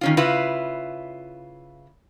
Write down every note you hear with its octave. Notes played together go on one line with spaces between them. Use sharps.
D#3 C#4 F4
C#3 E4 F4 B4